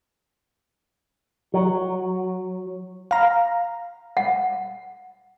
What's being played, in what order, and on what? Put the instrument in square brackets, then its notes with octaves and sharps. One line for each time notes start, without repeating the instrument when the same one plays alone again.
[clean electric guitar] F#3
[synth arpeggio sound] F5 A#5
[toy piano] F#5